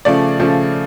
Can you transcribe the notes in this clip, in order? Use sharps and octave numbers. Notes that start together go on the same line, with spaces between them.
C#3 F3 A3 D5
C#3 F3 A3